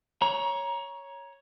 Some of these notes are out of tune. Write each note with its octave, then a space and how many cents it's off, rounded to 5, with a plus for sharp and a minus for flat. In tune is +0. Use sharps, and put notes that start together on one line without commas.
C#5 +0 A#5 +25